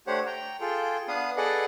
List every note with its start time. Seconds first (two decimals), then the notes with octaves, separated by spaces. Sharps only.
0.07 A3 D4 G4 C5 C#5 F#5
0.26 G5 A#5
0.61 F4 G#4 A4 G5
1.08 B3 D4 B4 F5 D#6
1.37 G#4 A4 B4 D5 D#5 F#5